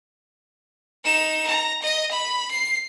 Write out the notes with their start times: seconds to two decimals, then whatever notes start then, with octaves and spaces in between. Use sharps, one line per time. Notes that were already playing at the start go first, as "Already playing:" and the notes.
1.04 D#4 E7
1.47 A#5
1.82 D#5
2.11 B5
2.51 C7